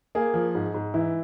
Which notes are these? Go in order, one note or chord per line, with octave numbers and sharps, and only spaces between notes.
A#3 G#4
F3
G#2
G#2
E3 E4